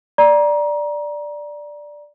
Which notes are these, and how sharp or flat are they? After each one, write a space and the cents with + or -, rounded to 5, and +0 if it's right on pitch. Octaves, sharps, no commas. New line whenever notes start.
D5 +0 A#5 +25